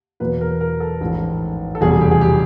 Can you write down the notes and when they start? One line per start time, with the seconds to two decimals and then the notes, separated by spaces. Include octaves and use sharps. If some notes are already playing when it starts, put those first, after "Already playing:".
0.20 E2 B2 F#3 A#3 B4
0.41 A#4
0.61 A#4
0.80 A4
1.01 A1 G#2 F3
1.75 A4
1.81 F1 E2 B2 G3 G#4
1.91 G#4
2.01 G4
2.11 G#4
2.21 G4